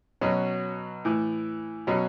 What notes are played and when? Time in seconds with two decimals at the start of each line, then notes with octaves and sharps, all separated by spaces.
0.21 B2 F#3 C#4
1.05 A2 E3
1.87 B2 F#3 C#4